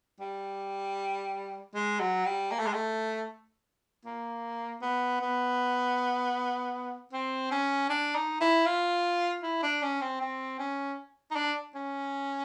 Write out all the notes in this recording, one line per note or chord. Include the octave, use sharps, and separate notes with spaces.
G3
G#3
F#3
G3
A#3
A3
G#3
A3
A#3
B3
B3
C4
C#4
D4
D#4
E4
F4
E4
D4
C#4
C4
C4
C#4
D#4
D4
C#4